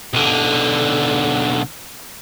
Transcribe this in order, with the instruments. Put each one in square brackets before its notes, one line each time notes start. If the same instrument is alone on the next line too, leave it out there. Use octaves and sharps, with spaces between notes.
[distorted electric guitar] B1 D3